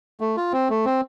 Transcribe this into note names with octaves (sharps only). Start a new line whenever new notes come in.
A3
F4
C4
A3
C4